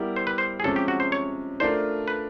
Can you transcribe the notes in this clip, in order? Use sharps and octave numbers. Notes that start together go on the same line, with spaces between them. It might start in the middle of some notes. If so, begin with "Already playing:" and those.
Already playing: G3 B3 E4 G4 A#4
C5
B4
C5
G#4
C3 F3 G#3 C#4 A4
G4
F#4
C5
C#5
A3 D4 F4 A#4 C5
B4